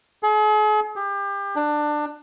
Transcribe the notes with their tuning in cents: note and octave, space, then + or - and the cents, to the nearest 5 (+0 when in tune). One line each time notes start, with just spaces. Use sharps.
G#4 +45
G4 +30
D4 +20